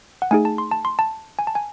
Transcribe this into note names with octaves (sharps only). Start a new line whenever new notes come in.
F#5
A3 D#4 G#4 G#5
A5
C6
A5
C6
A5
G#5
A5
G#5